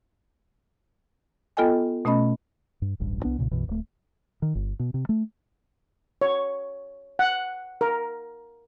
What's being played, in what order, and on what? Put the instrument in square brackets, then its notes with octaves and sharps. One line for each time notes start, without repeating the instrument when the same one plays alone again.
[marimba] B3 F4 A4 D#5 G5 G#5
B2 A3 C#4 D#5 B5
[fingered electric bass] G2
D1 A1 G2
C2 B3 D4
B1 F#2 A#2 C#3
B1 F#2 B2 E3
D1 A3
D#3
G1
B2
C3
A3
[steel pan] C#5
F#5
A#4